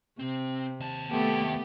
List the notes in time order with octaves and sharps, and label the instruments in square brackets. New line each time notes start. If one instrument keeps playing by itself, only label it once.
[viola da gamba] C3 [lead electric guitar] C4
[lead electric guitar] D#2 A5
[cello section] A3 [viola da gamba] B3 [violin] G4